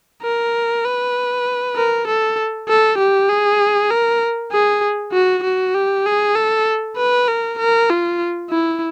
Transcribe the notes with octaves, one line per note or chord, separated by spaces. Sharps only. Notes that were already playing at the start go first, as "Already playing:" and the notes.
A#4
B4
A#4
A4
A4
G4
G#4
A#4
G#4
F#4
F#4
G4
G#4
A4
B4
A#4
A#4
F4
E4